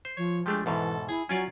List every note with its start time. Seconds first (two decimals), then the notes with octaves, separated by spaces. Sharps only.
0.05 C5
0.17 F3 C#5
0.46 F3 G#3 A3 D4 G4
0.66 E2 G#2 B2 E3 A4
1.09 E4 G#4
1.29 F#3 C#4 F4 D5 G#5